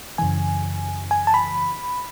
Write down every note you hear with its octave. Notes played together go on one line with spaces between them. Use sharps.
F#2 C#3 E3 G#5
G#5
A5
B5